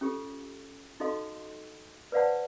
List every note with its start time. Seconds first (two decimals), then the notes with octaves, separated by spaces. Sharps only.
0.01 C#4 F4 G4 A4
1.00 D#4 F#4 A4 D#5 F5 C6
2.12 B4 C5 D5 F5 F#5 A5